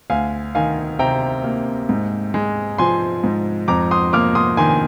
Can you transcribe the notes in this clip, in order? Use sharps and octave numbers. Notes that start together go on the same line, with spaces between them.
D2 F5 G#5
D#3 F5 G#5
C3 G5 A#5
A#3
G#2
G#3
F3 G#5 C6
G#2
F2 A#5 D6
C6 D#6
A#3 D6 F6
C6 D#6
D#3 G#5 C6
G#5